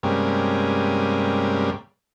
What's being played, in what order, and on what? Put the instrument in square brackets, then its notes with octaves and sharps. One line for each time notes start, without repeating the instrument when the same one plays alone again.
[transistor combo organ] G2 C3 G3 G#3 A#3 C#4